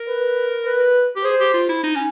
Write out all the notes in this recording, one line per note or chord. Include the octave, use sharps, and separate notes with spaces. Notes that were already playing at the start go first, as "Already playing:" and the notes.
Already playing: A#4
B4
B4
G4
G#4 C5
G4
F4
E4
D#4
C#4